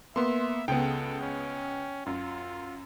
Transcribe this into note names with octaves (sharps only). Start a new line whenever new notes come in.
A#3 B3 E5 C6
C#2 C#3 B3 A4 G5
C#4
F#2 F4